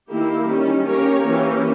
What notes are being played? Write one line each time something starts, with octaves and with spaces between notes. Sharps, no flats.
D#3 A#3 E4 G4
D#3 G3 C#4
A#3 C#4 G4 A#4 C#5
E3 A#3 C#4 G4